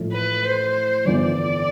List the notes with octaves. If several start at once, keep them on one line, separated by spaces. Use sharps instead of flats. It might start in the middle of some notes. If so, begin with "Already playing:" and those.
Already playing: A1 A2 F3
B4
C5
G1 F2 E3 B3 D5